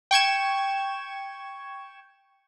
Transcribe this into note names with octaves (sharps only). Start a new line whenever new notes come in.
G5 C#6 G#6 E7